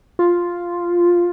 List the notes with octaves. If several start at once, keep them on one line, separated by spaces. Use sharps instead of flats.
F4